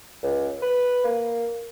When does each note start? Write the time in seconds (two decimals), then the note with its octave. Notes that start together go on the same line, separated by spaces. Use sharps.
0.22 C#2
0.62 B4
1.04 A#3